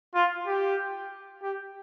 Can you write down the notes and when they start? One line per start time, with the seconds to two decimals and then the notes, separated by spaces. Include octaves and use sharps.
0.15 F4
0.47 G4
1.42 G4